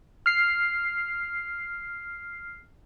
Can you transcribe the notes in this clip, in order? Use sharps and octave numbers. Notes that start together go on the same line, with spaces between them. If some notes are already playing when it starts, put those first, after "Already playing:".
F6 C7